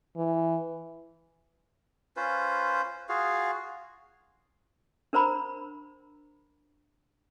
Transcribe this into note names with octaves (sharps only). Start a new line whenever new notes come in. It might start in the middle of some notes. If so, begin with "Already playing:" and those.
E3
C#4 F4 B4 C5
F4 F#4 G#4 F5
D4 A#4 C5 A#5 B5